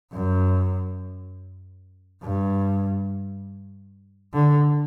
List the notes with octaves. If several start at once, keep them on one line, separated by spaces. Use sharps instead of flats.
F#2
G2
D3